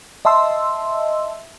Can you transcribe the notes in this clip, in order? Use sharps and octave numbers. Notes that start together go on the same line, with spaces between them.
D#5 E5 A5 C6 E6